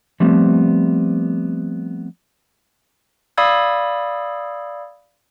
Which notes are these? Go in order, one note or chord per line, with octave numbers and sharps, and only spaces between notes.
F3 G3 A3 B3 C4
D5 F5 B5 D#6 E6 G#6